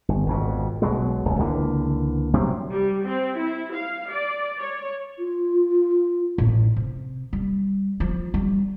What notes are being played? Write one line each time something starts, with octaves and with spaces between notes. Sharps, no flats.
G1
G#1 F2 B2
B1 B2 F#3 G#3
D1 C#2
C#2 D3 E3 A#3
C3 F#3 G3 C4
G3
C4
E4
F5
D5
C#5
F4
A1
C3
G3
F3
G3